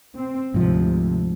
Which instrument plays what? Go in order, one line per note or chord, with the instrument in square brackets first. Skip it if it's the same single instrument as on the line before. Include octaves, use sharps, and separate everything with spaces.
[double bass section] C4
[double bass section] D2 C3 [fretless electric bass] G#2 F3